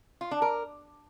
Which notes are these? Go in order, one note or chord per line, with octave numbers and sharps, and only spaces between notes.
F4
D4
A#4